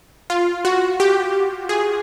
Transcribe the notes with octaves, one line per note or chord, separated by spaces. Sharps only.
F4
F#4
G4
G#4